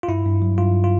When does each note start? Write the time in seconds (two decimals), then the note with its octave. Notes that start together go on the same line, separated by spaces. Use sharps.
0.03 F4
0.08 G2 E4
0.25 G2
0.42 F#3
0.58 G2 F4
0.84 F4